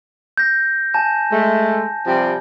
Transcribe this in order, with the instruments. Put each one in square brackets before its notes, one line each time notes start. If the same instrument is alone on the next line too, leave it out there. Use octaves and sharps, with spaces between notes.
[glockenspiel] G6 A#6
G#5 A5 G6
[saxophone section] G#3 A3
C3 F3 G3